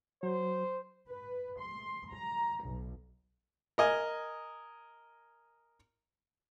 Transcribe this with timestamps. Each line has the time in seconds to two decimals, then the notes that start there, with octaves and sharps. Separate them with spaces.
0.23 F#3 C5
1.07 B4
1.58 C6
2.10 A#5
2.63 B1
3.78 A#4 D#5 G#5